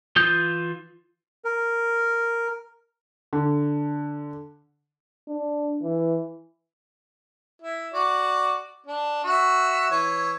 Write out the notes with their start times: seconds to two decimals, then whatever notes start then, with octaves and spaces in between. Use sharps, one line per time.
0.16 E3 F4 D#6 G6
1.44 A#4
3.33 D3
5.28 D4
5.82 E3
7.62 E4
7.94 F#4 D5
8.86 D4
9.24 F#4 E5
9.91 E3 C#5